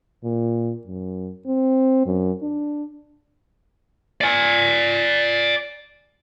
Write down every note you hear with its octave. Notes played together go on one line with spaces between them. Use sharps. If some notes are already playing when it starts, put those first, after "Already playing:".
A#2
F#2
C4
F#2
D4
D5 G#5